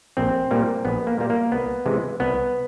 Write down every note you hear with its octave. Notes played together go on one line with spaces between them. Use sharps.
A#1 C4
A#2 G3 A#3
A#1 B3
A#3
A#2 G3 A#3
A#3
C2 B3
C3 E3 G#3
C2 B3